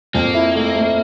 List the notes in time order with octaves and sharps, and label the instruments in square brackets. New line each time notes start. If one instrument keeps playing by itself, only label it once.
[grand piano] F2 [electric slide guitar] A#3
[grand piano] E4
A3
A3